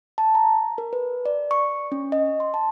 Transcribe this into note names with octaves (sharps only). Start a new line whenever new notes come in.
A5
A#5
A#4
B4
D5
C#6
C#4
D#5
C6
A5